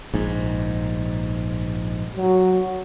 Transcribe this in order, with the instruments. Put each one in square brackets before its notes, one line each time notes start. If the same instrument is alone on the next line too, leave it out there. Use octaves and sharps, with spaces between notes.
[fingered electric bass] A#1 G#2
[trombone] F#3